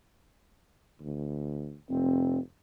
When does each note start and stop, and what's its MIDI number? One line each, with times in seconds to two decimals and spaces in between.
1.01 1.76 38
1.89 2.38 29
1.89 2.39 60